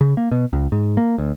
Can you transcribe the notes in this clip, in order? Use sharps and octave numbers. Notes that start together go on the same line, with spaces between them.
C#3
A#3
B2
C#2
G#2
A#3
D2